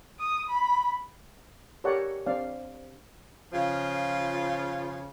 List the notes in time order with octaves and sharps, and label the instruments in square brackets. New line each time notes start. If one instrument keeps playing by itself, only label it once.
[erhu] D#6
B5
[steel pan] G4 A4 A#4 C#5 D5 F#5
C4 D4 D5 F5
[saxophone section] C#3 F3 F4